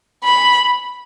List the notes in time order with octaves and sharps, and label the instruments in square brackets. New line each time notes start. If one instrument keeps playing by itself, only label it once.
[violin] B5